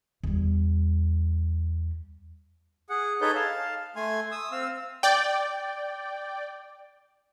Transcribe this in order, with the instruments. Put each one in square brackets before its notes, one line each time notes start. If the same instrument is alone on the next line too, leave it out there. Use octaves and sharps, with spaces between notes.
[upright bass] E2 G3
[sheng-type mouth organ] G#4 F#5
D#4 G#4 A4 B4 C#5 G6
F5 A5
A3 G#5 C6
D#6 E6
C4 F5 E6
[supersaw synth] D5 G5